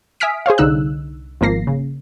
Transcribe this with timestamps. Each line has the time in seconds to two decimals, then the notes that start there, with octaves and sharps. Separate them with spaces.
0.20 E5 G#5 D#6 F6 B6 D7
0.46 G#4 C5 C#5 F5
0.58 C2 D3 D#4 E6 F#6
1.41 G#1 F3 A#3 A#6 C7
1.67 C#3